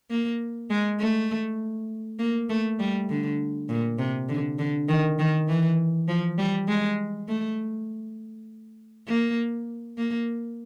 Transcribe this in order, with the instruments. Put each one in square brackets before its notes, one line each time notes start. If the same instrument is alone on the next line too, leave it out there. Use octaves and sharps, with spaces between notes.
[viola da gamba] A#3
G#3
A3
A#3
A3
G3
D3
A#2
C3
D3
D3
D#3
D#3
E3
F3
G3
G#3
A3
A#3
A#3